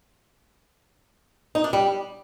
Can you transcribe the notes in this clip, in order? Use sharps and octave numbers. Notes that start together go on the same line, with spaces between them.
D#4
D4
G3